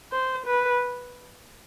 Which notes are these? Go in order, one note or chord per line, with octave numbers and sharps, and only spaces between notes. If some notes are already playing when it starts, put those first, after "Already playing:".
C5
B4